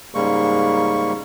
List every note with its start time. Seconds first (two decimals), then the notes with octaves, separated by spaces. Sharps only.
0.15 G#2 C#3 G3 G#3 A#3 C#6